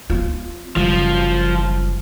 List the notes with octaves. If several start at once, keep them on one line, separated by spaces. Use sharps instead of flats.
C4 F4
F#1 F3 G3